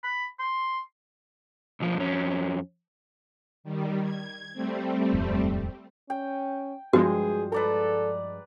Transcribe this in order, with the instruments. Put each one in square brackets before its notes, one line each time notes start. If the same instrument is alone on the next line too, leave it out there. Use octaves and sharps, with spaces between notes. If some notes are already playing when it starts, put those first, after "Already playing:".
[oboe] B5
C6
[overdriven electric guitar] B1 F3
F2 C#4
[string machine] D#3 G3
G#6
G3 A3 C4
[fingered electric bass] D#1 F2 G#2
[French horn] C#4 [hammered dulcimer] G5
[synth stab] G2 F3 G#3 [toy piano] F#4 [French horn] G#4 [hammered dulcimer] C5
[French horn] A4 [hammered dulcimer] B4 D5 A#5